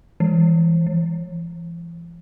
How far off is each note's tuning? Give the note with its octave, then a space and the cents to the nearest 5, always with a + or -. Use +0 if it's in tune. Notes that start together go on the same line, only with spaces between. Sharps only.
E3 +10
E3 +40